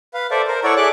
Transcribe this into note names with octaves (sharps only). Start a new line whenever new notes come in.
B4 F5
A4 C5 D5 E5
A#4 C5
E4 A4 C#5 D5 F#5 C#6
G#4 A4 D5 E5 D6 F#6